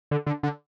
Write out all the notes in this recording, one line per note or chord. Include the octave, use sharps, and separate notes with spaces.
D3
D3
D3